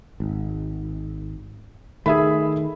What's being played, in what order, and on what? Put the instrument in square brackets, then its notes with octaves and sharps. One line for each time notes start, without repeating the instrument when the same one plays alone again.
[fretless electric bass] G#1
[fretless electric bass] D#3 A3 [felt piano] G#4 E5 B5